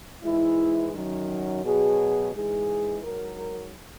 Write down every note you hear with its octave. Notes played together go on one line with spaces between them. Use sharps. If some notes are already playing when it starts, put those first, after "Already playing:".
G#2 E3 G#3 E4
F#2 D#3 F#3
B2 F#3 G#4
G#2 E3 G#3 G#4
G#2 F#3 A#4